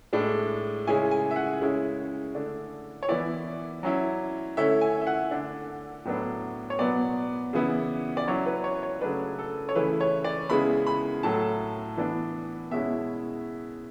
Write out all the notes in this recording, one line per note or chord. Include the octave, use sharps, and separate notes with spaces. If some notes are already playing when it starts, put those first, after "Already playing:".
A2 G#3 D4
C#3 G#3 C#4 E4 G#5
G#5
E5
F#5
C#3 G#3 C#4 E4
D3 A3 D4
C#5
E3 B3 E4 D5
F#3 C#4 E4
D3 A3 C#4 E4 E5
G#5
E5
F#5
D3 A3 D4
A2 F#3 B3 D4
C#5
B2 F#3 B3 D5
C#3 E3 B3 E4
D5
F#3 C#4 E4 C#5
B4
C#5
C#5
C#3 F#3 A3 D4 B4
A4
C#5
C#3 E3 A3 E4 B4
C#5
D5
C#3 G#3 B3 E4 B5
B5
A2 F#3 A3 A5
E3 B3 D4
B2 G#3 C#4 E4 E5